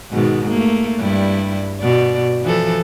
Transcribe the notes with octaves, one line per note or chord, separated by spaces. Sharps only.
G#2 B2 D#3
A3 A#3
G2 G3 E4
B2 D5
E3 F3 A4